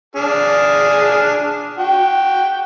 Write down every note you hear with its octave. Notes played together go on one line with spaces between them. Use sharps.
D4 G#4 F6
F#4 G5